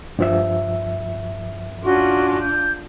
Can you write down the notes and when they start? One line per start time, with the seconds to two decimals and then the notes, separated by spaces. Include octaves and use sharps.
0.19 G2 F3 E5
1.85 C#4 D4 F4 F#4 C6
2.40 G6